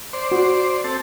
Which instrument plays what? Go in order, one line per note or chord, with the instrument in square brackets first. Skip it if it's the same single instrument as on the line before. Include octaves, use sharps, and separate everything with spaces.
[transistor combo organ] C5 D5
[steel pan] F#4
[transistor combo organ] C4 A4